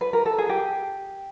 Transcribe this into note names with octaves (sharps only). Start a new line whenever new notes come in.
B4
A#4
A4
G#4
G4